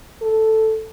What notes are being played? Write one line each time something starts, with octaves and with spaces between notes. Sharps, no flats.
A4